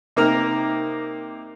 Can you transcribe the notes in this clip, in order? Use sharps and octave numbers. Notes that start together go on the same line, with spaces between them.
C3 A#3 D#4 A#5 F6